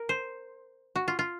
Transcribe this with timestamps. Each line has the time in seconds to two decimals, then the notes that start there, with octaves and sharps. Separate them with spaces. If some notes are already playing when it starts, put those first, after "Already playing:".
Already playing: A#4
0.09 C5
0.96 F#4
1.08 F4
1.19 F4